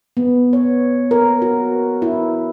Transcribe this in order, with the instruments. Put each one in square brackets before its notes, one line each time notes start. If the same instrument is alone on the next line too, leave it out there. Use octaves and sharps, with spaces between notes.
[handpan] B3
C#5
A#4
F#4
E4